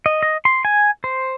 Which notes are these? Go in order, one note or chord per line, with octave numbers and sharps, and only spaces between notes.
D#5
D#5
C6
G#5
C5